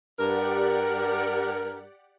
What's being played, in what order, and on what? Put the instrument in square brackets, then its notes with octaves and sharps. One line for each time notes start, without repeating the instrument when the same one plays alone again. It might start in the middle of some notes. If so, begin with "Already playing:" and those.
[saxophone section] G2 A#4 [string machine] G4 D5 F#5